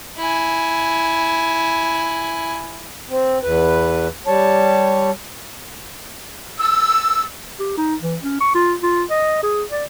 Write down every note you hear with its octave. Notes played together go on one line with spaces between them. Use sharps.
E4 G#5
C4
E2 B4
G3 C#5 A5
E6
G4
D#4
E3
C#4
C#6
F4
F4
D#5
G#4
D5